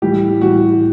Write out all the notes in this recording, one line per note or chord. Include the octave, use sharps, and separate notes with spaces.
A2 E3 G3 G4
A2 E3 G3 F#4